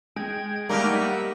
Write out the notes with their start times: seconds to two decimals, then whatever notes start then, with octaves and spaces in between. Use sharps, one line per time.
0.16 G#3 G5 G#6
0.69 G3 A3 A#3 D#4 G4 A#4 F#5
1.01 E6